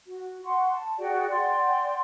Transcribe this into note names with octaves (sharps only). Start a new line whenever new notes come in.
F#4
F#5 C6 C#6
A5
F#4 G#4 D5 G5
D5 F#5 G5 C6